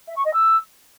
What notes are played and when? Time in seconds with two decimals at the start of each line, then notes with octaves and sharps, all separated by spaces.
0.08 E5
0.16 C#6
0.25 D#5
0.33 E6